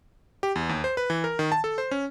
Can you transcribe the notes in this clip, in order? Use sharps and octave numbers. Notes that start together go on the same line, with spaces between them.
G4
E2
D#2
C5
B4
E3
A#4
D#3
A5
A4
C5
C#4